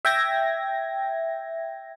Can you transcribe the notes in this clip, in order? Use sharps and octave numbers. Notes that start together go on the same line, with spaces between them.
E5 G5 G#6 A#6